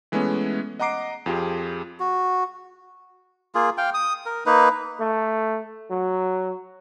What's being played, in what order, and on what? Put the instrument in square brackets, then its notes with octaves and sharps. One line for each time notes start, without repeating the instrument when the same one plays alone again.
[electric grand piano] E3 G#3 A3 B3 C#4
D#5 F#5 A#5 D6 C7 D7
F2 F4 G4 G#4
[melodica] F#4
A#3 F4 G#4
F5 G5
D#6
A#4
A#3 D#4 B4
[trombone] A3
F#3